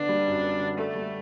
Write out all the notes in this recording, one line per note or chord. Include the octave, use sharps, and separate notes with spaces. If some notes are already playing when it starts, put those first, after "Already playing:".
Already playing: D3 B3 D4
G3
F#2
B3
D3
A3 A4
G3